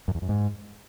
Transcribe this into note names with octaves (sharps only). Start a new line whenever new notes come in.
F#2
E2
F#2
G#2